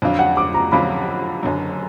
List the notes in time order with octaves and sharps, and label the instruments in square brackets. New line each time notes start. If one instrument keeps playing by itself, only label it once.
[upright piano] F2 D3 F#3 D4 F4
[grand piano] F#5
D6
A#5
[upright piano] F2 D3 F#3 D4 F4 [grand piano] B5
[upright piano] F#1 F#2 D3 F#3